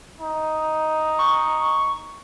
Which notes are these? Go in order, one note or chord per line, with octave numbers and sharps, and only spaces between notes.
D#4
C#6